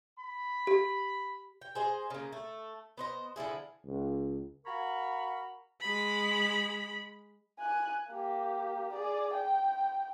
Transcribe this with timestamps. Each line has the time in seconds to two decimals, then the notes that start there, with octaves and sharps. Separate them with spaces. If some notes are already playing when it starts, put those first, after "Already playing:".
0.18 B5
0.67 G4
1.62 G5
1.75 G#4 C5 D#5
2.10 C#3 A#3
2.32 A3
2.97 B3 C5 D#5
3.36 D3 F3 E4 G#4
3.85 C#2
4.65 F#4 A#4 F5 A#5 B5 C#6
5.81 G#3 B5
7.59 G#5 F#6
8.10 A#3 G4
8.93 G#4 D5
9.34 G5